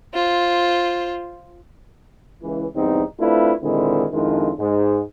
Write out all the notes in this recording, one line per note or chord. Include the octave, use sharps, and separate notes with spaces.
F4 C5
C#2 E3
B1 E2 G2 C4 D#4
A3 C4 D4 E4 F4 B4
A#2 D3 D#3 G#3 C4 E4
F2 D#3 G#3 D4 E4 F4
G#2 G#3